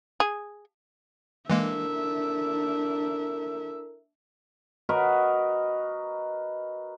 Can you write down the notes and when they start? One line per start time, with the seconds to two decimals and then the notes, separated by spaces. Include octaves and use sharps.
0.20 G#4
1.50 E3 G#3 A#3 D4 E4 A4 A#4 E5
4.89 F#4 A#4 B4 D#5